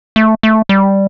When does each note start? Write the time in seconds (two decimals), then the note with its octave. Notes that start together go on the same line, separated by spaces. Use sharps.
0.16 A3
0.43 A3
0.69 G3